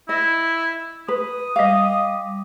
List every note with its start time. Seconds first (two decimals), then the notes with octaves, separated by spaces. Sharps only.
0.09 E4 D#5
1.08 B4 D#6
1.56 G3 D#5 F5 D6